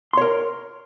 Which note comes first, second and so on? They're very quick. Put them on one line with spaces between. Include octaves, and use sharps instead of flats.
C6 C#5 A#4